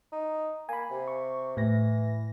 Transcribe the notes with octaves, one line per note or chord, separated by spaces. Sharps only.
D#4
A#3 G#5 B5
C3
C#6
A2 E3 A#6